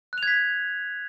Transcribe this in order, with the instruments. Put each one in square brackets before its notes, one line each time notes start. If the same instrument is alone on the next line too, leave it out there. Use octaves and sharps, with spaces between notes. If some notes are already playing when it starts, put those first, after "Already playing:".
[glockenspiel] F#6
F7
G#6
B6